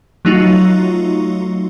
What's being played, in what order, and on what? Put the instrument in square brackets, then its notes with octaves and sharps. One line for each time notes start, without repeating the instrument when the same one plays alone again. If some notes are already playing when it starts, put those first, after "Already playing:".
[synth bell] F#3 A3 D#4 F4 F#4